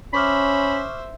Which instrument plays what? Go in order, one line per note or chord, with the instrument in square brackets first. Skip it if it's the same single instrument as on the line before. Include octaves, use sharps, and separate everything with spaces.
[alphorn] C#4 [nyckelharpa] C5 E5 [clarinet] B5 [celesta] C#6 D6 F6